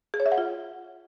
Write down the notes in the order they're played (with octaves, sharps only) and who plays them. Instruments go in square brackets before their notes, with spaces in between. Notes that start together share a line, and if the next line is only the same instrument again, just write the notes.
[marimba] G#4
C#5
E5
F#5
F4